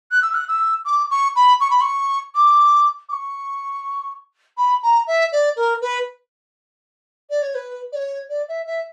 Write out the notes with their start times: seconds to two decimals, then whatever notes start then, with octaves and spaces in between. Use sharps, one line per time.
0.11 F#6
0.22 E6
0.34 F#6
0.48 E6
0.85 D6
1.10 C#6
1.35 B5
1.60 C#6
1.70 B5
1.81 C#6
2.34 D6
3.08 D6
3.12 C#6
4.57 B5
4.83 A#5
5.07 E5
5.32 D5
5.56 A#4
5.81 B4
7.30 D5
7.42 C#5
7.54 B4
7.92 D5
7.95 C#5
8.29 D5
8.48 E5
8.66 E5